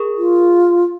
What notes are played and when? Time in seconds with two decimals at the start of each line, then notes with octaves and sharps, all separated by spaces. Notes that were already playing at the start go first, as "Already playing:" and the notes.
Already playing: G#4 A#4
0.18 F4